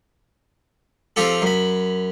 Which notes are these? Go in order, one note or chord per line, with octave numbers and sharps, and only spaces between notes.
F3 C4 F4 G4 A4
F#2 B5